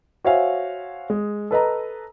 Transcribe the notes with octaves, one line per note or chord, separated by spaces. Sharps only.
F#4 C5 C#5 E5 F5 G#5
G#3
A4 B4 D#5 A#5